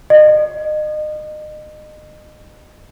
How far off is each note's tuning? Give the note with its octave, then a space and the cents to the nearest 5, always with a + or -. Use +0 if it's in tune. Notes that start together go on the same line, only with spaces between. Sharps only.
D#5 -30